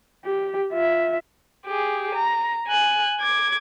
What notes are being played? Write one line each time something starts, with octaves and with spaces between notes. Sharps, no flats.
G4
F4 E5
G4 G#4
A#5
G#5 F#6
D6 G#6